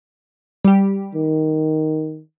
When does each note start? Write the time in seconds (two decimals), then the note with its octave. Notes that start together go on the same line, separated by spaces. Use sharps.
0.65 G3 G4
1.15 D#3